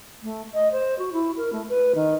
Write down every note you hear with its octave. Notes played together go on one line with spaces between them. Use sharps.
A3
D#5
C5
F#4
E4
A#4
A3
B4
D#3